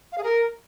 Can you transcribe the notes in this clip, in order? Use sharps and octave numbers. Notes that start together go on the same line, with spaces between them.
F5
G#4
A#4